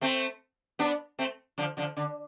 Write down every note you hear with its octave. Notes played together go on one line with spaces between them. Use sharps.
A3 C4
B3 D4
A3 C4
D3 F3
D3 F3
D3